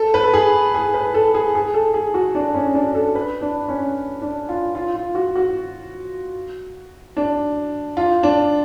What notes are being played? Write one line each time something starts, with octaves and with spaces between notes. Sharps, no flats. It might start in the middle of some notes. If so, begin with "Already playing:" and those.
Already playing: A4
B4
A4
G#4
G#4
B4
A4
G#4
G#4
A4
G#4
F#4
D4
C#4
D4
A4
B4
D4
C#4
D4
F4
F4
F4
F#4
F#4
D4
F4
D4